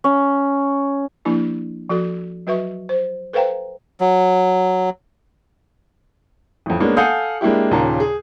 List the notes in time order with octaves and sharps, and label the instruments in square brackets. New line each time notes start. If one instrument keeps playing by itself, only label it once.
[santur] C#4
[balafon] F3 A#3 D4 E4 G4
F3 F#4 A4
F#3 F#4 B4 E5 C#6
C5
A4 B4 C5 F5 G5 A#5
[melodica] F#3
[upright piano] A1 F2
G#3 A#3 B3 C#4 D4
A4 F5 F#5 G#5 D#6 G6
G#3 A#3 D4 E4 G4
D#2 A#2 C#3 A5 A#5
G#4